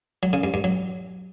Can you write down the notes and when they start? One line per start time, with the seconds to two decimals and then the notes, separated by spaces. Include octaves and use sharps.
0.23 F#3
0.33 C#3
0.44 G2
0.54 G2
0.64 F#3